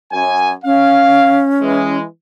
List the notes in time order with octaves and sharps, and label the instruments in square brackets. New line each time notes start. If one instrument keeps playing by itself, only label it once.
[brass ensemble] F#2 G#5
[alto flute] C#4 [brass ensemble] F5
[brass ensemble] E3 G#3